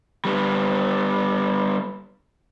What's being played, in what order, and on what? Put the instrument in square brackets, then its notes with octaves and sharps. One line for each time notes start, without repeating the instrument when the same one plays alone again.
[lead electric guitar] G3 B3